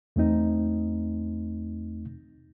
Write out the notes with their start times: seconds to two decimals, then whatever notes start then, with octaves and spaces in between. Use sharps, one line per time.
0.16 E2 A3 C4 D#4